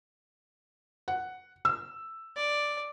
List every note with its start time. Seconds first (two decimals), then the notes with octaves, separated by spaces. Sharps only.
1.08 F#5
1.65 E6
2.36 D5